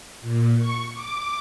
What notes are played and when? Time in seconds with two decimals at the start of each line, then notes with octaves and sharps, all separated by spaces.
0.22 A#2
0.58 C#6
0.93 D6